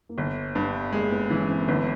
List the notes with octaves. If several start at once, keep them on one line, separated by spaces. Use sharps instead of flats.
A#3
G1 B3
G2 B3
G#3 A#3
B3
E3 C#4
C4
A#3
G1 B3